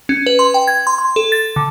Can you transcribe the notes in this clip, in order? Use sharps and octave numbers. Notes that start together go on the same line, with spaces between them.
C#4
B4
C6
G5
G#6
C6
C6
A4
A6
D3